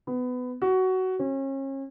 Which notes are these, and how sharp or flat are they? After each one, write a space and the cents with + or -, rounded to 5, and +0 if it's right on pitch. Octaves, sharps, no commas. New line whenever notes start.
B3 +20
F#4 +15
C#4 -35